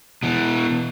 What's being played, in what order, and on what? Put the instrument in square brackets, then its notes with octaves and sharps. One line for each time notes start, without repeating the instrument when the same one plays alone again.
[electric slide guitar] B2 E3